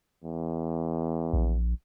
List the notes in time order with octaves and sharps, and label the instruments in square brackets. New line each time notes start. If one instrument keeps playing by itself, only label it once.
[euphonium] E2
[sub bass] A#1